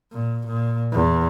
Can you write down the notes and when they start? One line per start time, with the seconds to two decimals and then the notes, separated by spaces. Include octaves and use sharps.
0.12 A#2
0.47 A#2
0.93 E2